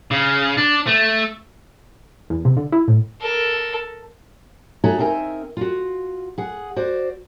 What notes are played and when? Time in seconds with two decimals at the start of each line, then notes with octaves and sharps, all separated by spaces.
0.11 C#3
0.57 D4
0.87 A3
2.30 E2
2.45 C3
2.57 D3
2.72 E4
2.88 A2
3.21 A4 A#4
4.84 D#4 F#4 G#4 A4 C#5 E5
4.99 C4 D#4 A#4 E5 G#5
5.57 F4 F#4
6.38 G#4 F#5
6.76 F#4 C5 D5